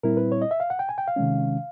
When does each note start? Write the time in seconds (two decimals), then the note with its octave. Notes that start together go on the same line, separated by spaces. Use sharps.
0.03 A#2 G3 C4 E4 A#4
0.17 B4
0.32 C#5
0.42 D#5
0.51 E5
0.60 F5
0.70 F#5
0.79 G5
0.89 G#5
0.98 G5
1.08 F5
1.16 C3 D#3 G#3 C#4